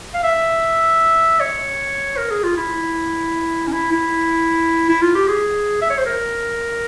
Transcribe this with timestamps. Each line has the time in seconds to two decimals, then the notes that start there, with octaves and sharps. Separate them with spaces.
0.14 F5
0.23 E5
1.40 C#5
2.17 A#4
2.31 G#4
2.44 F4
2.57 E4
3.67 C#4
3.73 E4
3.92 E4
4.89 E4
5.02 F4
5.15 G4
5.28 G#4
5.82 E5
5.90 C#5
5.98 C5
6.06 A#4